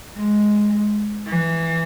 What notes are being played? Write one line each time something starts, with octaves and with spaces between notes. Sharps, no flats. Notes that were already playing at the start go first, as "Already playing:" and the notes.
G#3
E3